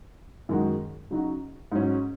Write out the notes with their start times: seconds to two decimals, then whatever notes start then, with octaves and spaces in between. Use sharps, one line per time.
0.49 F#2 D#3 G#3 F#4
1.11 C#3 F#3 D#4 F#4
1.72 G#2 F#3 C#4